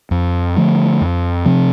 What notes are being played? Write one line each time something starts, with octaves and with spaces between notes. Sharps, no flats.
F2
D3 F3 A3
F2
C3 F3 C4